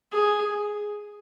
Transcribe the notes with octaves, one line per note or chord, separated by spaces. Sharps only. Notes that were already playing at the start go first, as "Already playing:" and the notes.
G#4